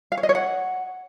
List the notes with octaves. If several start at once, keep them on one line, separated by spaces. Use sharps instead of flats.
F5
C#5
D#5
C#5
F#5